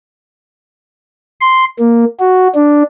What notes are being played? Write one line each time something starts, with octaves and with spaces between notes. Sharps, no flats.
C6
A#3
F#4
D4